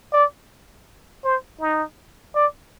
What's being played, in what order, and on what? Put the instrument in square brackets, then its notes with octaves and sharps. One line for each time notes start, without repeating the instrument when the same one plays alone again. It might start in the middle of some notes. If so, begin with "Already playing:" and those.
[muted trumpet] D5
C5
D#4
D5